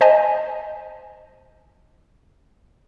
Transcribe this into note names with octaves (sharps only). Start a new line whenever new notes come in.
C5 D#5 G#5 A5